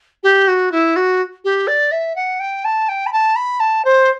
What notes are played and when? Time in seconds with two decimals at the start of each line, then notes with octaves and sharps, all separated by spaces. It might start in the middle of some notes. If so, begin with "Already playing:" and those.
0.23 G4
0.48 F#4
0.72 E4
0.96 F#4
1.45 G4
1.67 D5
1.92 E5
2.16 F#5
2.40 G5
2.64 A5
2.89 G5
3.06 B5
3.13 A5
3.36 B5
3.60 A5
3.85 C5